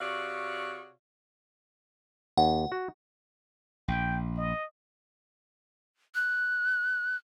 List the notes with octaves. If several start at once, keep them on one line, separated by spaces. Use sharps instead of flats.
C3 F#4 G#4 C#5 D5 F5
D#2 F#5
F#4
A#1 G5
D#5
F#6